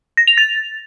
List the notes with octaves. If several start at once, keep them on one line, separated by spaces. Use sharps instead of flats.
A#6
F7
A6